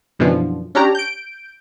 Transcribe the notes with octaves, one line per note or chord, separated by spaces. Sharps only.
F#2 B2 D3 E3 F3
C#4 D4 G4 A#5
G6 D7